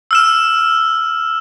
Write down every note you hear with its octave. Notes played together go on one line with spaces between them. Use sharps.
E6 F6 E7